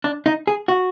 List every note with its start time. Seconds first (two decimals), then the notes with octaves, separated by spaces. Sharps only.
0.04 D4
0.26 D#4
0.47 G#4
0.68 F#4